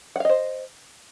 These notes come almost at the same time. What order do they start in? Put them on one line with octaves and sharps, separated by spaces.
F#5 F5 D#5 C5